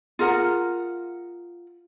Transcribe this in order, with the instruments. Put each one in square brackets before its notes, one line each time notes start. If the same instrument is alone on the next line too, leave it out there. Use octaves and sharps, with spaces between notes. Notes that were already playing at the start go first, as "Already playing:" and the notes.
[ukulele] F4 G#4 A#4 F#5